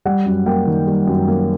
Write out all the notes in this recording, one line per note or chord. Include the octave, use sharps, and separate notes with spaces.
G3 F#5
F#2
A#3 G5
D#3
G3
F#2
A#3